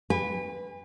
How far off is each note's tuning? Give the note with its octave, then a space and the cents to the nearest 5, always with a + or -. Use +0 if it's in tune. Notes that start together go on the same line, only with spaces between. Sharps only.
B4 +0 G#5 -40